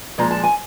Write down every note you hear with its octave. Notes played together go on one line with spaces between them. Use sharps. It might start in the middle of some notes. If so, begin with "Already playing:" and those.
A#2 F3 G#3 A#5
A5
G#5